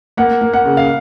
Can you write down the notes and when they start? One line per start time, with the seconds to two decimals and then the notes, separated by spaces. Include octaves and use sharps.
0.17 A#3 F#5
0.41 A#3
0.54 F#5
0.65 C#3
0.77 F5